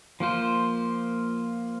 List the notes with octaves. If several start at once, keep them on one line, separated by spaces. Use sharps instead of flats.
F3 A#3 F4 C5